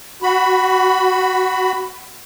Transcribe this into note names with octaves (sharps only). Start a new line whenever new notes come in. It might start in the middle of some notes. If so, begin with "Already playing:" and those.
F#4 B5